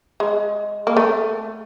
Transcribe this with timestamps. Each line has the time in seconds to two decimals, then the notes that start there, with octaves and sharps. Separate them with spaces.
0.20 G#3
0.87 A#3
0.97 A3